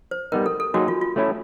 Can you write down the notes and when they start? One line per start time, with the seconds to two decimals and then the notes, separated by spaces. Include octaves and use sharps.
0.11 C5
0.32 G3 B3 D#4 A#4
0.46 A4
0.60 A4
0.74 F#3 A#3 D#4 F#4 G#4
0.88 F4
1.01 F4
1.16 A3 C#4 E4